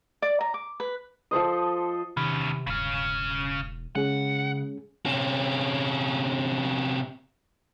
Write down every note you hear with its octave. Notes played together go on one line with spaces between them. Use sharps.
D5
A#5
D6
B4
F3 A4 C5 D#5
E2 C3 D#3 C#4 B5
E1 D2 G2 C#3 C#4
C#3 G#3 C#4 G#4 F#5
C3 C#4